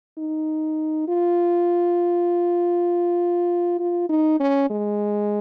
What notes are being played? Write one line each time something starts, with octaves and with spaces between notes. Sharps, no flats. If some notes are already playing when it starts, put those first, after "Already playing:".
D#4
F4
F4
D#4
C#4
G#3